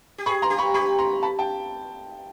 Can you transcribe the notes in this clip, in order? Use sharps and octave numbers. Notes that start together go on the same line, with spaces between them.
G4
G#4 B5 C#6
A#5 C6
G4
B5 C#6
G4 B5 C#6
A#5 C6
A5 B5
G5 A5